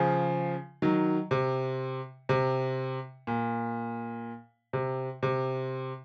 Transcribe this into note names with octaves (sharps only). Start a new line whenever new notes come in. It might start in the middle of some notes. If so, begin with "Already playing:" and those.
Already playing: C#3 F3
D#3 F#3
C3
C3
A#2
C3
C3